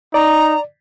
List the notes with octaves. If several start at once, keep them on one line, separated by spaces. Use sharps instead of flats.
D#4 D5 A#5